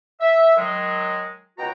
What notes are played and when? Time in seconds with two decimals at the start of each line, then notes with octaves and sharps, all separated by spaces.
0.20 E5
0.57 D#3 F#3 G#3
1.57 C#2 B2 F#4 G5 A#5